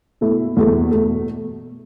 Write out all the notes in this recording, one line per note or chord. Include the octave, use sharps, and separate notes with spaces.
B2 A3 E4
E2 B2 A3
B2 A3